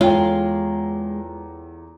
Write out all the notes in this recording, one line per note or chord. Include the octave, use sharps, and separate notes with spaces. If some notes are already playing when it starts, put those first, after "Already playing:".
E2 G#3 F4 A4 C#5 G5 A#5